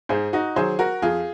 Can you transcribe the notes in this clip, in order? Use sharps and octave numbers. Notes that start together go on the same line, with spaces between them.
G#2 G#4 C5
D#4 F#4
D#3 F#3 G#4 C5
F#4 A#4
F2 F4 G#4